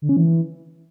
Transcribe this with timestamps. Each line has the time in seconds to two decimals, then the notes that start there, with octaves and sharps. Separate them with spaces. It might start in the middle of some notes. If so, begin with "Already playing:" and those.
0.02 D3
0.09 C#4
0.17 E3